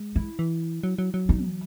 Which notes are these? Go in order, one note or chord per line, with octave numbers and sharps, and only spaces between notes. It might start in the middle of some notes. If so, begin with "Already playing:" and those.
Already playing: G#3
E4
E3
F#3
F#3
F#3
D#4
E3